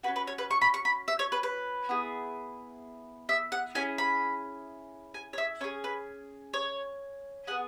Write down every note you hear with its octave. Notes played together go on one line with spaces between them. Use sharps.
C#4 F#4 B4
B4
C#5
B4
C#6
B5
C#6
B5
E5
C#5
B4
B4
B3 E4 G#4
E5
F#5
C#4 E4 G#4 G#5
B5
G#5
C#5
E5
C#4 G#4 C#5
B4
C#5
B3 G#4 F#5